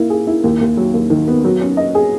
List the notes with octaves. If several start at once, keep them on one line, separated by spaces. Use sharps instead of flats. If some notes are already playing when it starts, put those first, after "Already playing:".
Already playing: A#3 E4
G#4
E4
D#2
D#2
F#3
D#2
D#3
B3
F#3
C#4
D#5
G#4